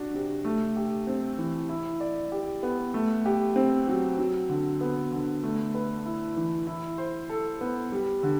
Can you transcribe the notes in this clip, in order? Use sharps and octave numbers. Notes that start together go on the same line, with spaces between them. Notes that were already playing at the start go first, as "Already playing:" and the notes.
Already playing: D4 F#4
C3
A3
G4
C4
E3
E4
D5
G4
B3
A3
G4
C4
F#3
F#3
D3
B3
D3
A3
B4
E4
E3
E4
C5
A4
B3
G3
D3